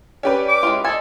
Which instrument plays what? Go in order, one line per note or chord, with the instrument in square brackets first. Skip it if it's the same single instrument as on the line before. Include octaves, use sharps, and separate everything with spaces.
[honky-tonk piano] C#4 G4 B4 [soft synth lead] D5
[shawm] D6
[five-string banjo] G#3 F4 [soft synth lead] E4
[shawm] A4 [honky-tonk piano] C5 [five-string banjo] D5 G#5 [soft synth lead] D#5